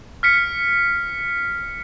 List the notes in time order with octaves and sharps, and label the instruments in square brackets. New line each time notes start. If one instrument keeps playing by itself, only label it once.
[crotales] F6 B6 C#7